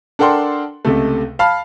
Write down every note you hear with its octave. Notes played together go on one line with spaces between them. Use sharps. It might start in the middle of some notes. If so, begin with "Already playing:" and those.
D4 A4 A#4 F#5 G5 C6
C#2 C3 A3
F5 A5 B5 F6